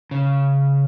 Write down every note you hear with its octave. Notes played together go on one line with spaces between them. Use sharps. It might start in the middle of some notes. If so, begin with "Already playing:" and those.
C#3